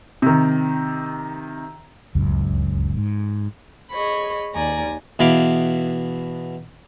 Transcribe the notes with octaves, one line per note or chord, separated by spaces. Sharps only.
C3 D#3
D1 C#2 F#2
G#2
G#4 C#5 D#5 B5
D#2 D5 G#5 A#5
E2 B2 E4 F5 D6